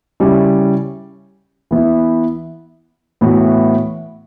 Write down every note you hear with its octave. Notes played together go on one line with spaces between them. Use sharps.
C#3 G3 C#4 E4
E3 B3 E4
A2 E3 B3 F#4